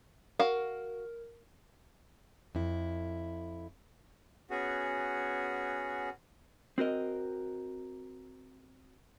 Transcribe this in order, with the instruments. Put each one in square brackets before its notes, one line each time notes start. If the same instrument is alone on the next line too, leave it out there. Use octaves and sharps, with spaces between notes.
[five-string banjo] F#4 F5 [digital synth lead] A#4
[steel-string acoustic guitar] F2 E4
[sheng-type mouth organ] B3 C#4 F#4 G#4
[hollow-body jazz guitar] C4 F#4 A#4 D#5